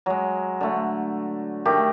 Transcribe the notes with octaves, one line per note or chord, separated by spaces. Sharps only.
F#3 G#3
D3 A3
D#3 A3 D#4 G4